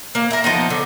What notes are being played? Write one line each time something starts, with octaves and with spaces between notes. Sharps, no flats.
A#3
A#4 E5
F3 B3 D#4
D3